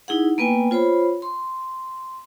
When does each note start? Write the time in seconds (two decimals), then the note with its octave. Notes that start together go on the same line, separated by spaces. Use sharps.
0.08 D#4 E4 G#4 F#5
0.38 A#3 B3 B4 G5 G#5
0.71 F4 C5 C#5 B5
1.22 C6